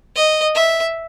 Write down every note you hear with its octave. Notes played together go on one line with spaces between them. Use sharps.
D#5
E5